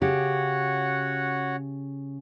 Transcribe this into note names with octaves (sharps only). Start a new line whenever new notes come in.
C#3 F#4 G4 C#5 F#5